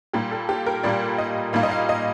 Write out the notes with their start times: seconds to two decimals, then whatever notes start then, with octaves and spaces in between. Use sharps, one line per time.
0.13 A#2 G3 A#3 G4
0.31 A4
0.49 G4
0.66 A#4
0.83 A#2 G3 A#3 D5
1.18 D#5
1.53 A#2 G3 A#3 F5
1.63 D#5
1.72 F5
1.89 D#5